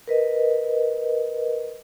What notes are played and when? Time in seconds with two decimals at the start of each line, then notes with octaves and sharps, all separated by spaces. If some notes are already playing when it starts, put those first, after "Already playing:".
0.08 A#4 B4 D#5